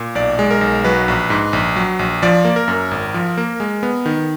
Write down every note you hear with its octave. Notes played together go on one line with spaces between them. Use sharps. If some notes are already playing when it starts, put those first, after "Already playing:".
Already playing: A#2
B1 D5
G#3
A#4
B1
F#3 B4
A#1
G#2
A#1
F#3
A#1
F3 D5
A#3
A#4
F#2
G#1
F3
A#3
G#3
B3
D#3